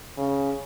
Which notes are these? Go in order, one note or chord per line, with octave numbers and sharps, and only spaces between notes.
C#3